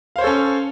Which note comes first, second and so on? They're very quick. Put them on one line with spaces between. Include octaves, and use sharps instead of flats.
F5 C5 C#5 A4 C#4